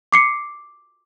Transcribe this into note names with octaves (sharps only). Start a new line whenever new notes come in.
D6 C7 C#7